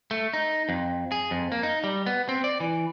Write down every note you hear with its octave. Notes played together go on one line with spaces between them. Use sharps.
A3
D#4
F2
G#4
F2
A#3
D#4
G3
B3
C4
D5
E3